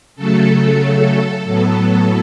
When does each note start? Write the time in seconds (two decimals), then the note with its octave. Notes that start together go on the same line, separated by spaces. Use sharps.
0.15 C#3 F#3 A3 A4
1.43 A2 F#3 B3 A4